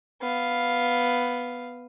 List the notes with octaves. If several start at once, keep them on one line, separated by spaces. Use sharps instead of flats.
B3 F5